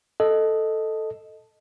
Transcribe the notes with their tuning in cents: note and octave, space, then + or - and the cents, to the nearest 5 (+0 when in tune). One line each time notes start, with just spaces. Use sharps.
A4 +0 D#5 +0